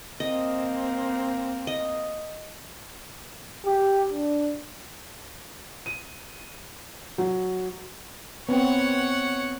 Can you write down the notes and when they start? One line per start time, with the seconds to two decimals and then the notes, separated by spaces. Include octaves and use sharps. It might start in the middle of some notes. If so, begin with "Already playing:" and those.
0.20 A#3 C4 D#5
1.67 D#5
3.65 G4
4.13 D4
5.86 D#7
7.18 F#3
8.49 B3 C4 C#5 F#5